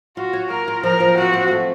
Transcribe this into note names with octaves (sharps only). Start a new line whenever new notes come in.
F4 F#4
C#5
A#3 A#4
F4
F3 A#4
F3
C4 F#4
C4
A3